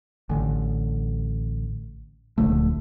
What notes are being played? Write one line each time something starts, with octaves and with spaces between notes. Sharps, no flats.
A1 D3
D1 A#1 D3 A3